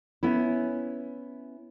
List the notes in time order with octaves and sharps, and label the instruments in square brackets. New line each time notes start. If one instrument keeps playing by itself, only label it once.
[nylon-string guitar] B3 C#4 E4